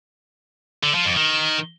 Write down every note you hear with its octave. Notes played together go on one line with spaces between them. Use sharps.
D3
F3
F2
D#3